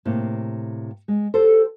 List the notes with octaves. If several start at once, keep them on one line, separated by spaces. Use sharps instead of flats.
A2 C3 A#3
G#3
G4 A4 C5